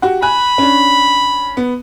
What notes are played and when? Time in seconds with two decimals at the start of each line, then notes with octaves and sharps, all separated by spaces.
0.02 F#4 G4 F#5
0.22 G#5 B5 F#6
0.58 C#4 D4
1.57 B3